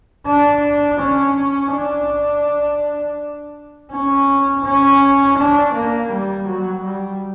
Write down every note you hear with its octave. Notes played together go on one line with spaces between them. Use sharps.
D4
C#4
D4
C#4
C#4
D4
A#3
G3
F#3
G3